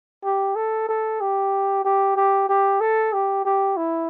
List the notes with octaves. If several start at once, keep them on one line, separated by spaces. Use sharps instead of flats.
G4
A4
A4
G4
G4
G4
G4
A4
G4
G4
E4